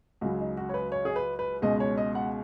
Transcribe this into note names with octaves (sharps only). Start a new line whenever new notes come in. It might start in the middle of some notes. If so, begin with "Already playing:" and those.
C#2 C#3 F#3 F#4
D#4
F#4
C#5
B4
C#5
G#4
B4
B4
C#2 B2 G#3 D#5
C#5
D#5
F#5